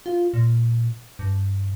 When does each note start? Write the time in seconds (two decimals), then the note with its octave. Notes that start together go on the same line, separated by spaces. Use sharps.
0.06 F4
0.34 A#2
1.19 G2